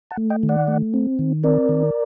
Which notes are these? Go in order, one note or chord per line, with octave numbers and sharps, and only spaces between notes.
F#5 A5
A3
D#5 G5
D#3
D5 F#5
A3
C4
D#3
C4 A#4 D5
D#3